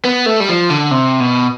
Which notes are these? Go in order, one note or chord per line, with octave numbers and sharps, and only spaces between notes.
B3
A3
G3
F3
D3
C3
B2